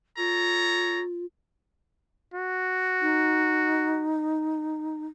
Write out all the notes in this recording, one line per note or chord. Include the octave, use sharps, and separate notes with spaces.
F4 A4 C#5 A#5
F#4
D#4